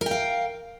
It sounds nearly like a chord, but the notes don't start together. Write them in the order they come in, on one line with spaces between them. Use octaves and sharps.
A#4 G5 F5